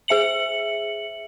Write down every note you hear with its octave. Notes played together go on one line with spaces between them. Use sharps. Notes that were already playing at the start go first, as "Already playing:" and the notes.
G#4 E5 C#7 F#7